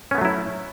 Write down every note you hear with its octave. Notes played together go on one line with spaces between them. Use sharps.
F#3 A3 B3 C#4 E4